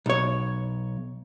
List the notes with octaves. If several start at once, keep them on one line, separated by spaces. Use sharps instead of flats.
B1 C#5